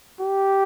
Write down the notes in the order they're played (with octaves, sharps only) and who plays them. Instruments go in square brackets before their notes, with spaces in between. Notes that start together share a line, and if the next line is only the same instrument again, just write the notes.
[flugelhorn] G4